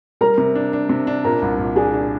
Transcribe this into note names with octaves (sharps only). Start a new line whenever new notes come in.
G3 A#4 A#5
C3
D4
D4
C3
D4
A#2 A#4 A#5
C2
A#2
D4 G#4 G#5
D4